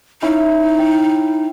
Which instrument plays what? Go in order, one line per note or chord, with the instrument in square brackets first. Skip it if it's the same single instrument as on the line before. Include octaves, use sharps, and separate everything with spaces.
[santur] C#4 E4 F5 [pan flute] D#4
[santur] G5